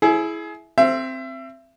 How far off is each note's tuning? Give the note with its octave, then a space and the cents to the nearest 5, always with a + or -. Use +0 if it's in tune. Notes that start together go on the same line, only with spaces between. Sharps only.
E4 +0 G#4 +25 E5 +0
C4 +0 E5 +30